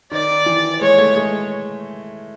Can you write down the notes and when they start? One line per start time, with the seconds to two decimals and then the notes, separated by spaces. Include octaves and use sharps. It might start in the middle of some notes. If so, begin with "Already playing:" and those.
0.11 D#3 D5
0.46 E3
0.81 G#3 C#5
0.98 A3
1.16 G#3